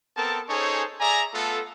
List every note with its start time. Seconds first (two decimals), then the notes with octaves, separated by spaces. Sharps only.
0.17 B3 C4 A4 A#4 A5
0.49 C#4 D#4 G#4 A4 C5 C#5
1.00 G#4 D5 E5 G#5 A#5
1.34 A3 B3 F4 A4